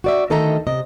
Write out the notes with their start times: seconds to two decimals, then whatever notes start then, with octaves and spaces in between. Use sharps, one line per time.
0.04 F#4 D5 E5
0.30 D2 D#3 A4 D#5 E5 A#5
0.67 C3 D#5